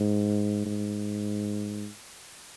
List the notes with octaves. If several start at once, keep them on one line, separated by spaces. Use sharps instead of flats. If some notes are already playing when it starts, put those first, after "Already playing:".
Already playing: G#2
G#2